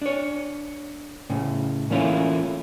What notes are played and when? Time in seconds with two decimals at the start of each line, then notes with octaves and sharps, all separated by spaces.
0.02 D4 C#5
1.30 A2 C#3
1.90 E3 A3 A#3 C#4 E4 F4